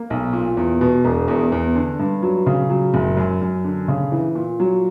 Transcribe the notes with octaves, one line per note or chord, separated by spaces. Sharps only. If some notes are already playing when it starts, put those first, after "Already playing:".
Already playing: A#3
B1
A#2
E2
B2
E1
E2
E2
D3
G2
F#3
C#3
F#3
F#1
F#2
F#2
D3
C#3
E3
A#2
F#3